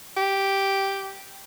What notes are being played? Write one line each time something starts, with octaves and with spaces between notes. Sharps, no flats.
G4